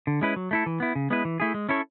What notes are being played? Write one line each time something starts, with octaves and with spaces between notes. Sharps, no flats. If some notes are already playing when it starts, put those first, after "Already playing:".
D3
G#3 C#4 E4 B4
F#3
A3 E4 A4
E3
B3 E4
C#3
G#3 B3 E4 B4
E3
A3 E4 G#4
G#3
C#4 E4 A4 C#5